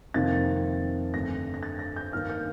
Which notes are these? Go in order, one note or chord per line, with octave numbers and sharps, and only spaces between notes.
F2 C3 D#3 A#3 A6
G2 D3 A3 C4 A#6
A#6
A6
A#6
G6
G2 D#3 A#3 F6
G6